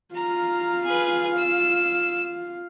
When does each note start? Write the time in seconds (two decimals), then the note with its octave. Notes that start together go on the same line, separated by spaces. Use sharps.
0.15 F4 F5 A#5
0.85 G#4 B4
1.37 E6